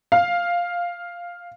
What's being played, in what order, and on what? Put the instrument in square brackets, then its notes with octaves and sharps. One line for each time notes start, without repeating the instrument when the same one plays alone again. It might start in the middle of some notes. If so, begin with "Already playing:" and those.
[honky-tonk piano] F5